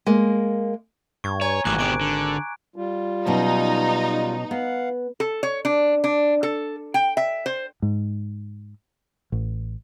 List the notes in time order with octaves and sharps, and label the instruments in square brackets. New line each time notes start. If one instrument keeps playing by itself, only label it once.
[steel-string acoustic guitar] G#3 A#3
[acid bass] G2 [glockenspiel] C#6 G#6
[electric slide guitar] C#5 [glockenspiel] G#5 A#5 G#6
[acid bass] G#1 [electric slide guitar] A2 E3 G3 [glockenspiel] D6 F#6
[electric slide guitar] B2 D3 G4 [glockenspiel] D6 D7
[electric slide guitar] D3
[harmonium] G3 F4
[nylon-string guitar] B2 F#3 C#4 [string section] D#4
[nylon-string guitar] B3 [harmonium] F5 F#5
[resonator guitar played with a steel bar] A4
C#5
D4
D4
A4
G5
E5
C5
[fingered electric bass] G#2
A1